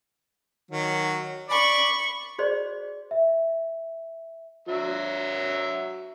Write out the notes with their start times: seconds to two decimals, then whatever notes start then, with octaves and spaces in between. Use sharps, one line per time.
0.71 D#3 F#3
1.49 D5 B5 C#6
2.39 F#4 G#4 C5 D5 D#5
3.11 E5
4.68 F#3 E5